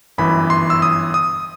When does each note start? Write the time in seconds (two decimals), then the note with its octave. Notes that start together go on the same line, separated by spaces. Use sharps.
0.18 G1 F#2 E3 B5
0.50 C6
0.70 E6
0.82 D#6
1.14 D#6